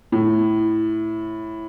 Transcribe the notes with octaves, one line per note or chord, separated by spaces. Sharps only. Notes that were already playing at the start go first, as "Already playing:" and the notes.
A2